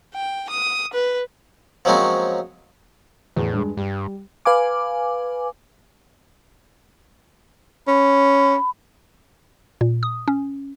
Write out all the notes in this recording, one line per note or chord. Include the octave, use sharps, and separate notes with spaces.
G5
D#6
B4
F3 F#3 G#3 A#3 C4 C#4
E2 A2
G2 G#3
G2 G3
B4 F5 G#5 D6
C#4 B5
A#2
D#6
C#4